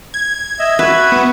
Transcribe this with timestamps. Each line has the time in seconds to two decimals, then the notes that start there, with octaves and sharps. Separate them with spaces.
0.14 G#6
0.59 D#5 E5
0.79 F#4 B4 E5
1.12 B3